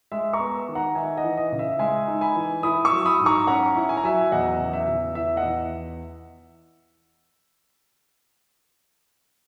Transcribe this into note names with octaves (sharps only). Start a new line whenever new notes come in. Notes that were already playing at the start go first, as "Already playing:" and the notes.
G#3 E5
A#5 C#6
B3
D#3
F#5 A#5
D#4 E5 G#5
D#5 F#5
E3
D#5
C#3
E5
G#3 E5 G#5
D#4
G#5 B5
E3
E4 B5 D#6
C#6 E6
F#3
B5 D#6
G#2
A#5 C#6
C#4 F#5 A#5
E4
G#5
A#5
F#3 E5 G#5
E2 D#5 F#5
C#3
E5
E2
E3 E5
D#5 F#5
E2